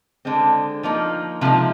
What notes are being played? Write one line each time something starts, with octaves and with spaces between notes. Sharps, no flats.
D3 G#3 C4
F3 A#3 D#4
C3 F3 G#3 D#4